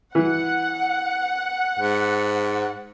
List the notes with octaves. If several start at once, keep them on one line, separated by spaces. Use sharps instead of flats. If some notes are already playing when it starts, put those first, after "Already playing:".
E3 F#5
G#2